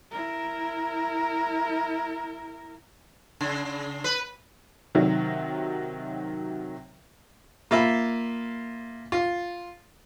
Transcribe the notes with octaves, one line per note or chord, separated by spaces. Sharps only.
E4 A#4
C#3
B4
C3 D#3 F#3
A#3 F4 E5 B5
F4